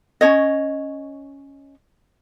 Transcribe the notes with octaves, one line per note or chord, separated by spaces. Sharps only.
C#4 D4 C#5 D#5